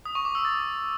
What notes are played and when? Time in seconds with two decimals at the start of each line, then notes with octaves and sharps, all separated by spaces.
0.05 D#6
0.15 C#6
0.25 D6
0.35 E6
0.45 A6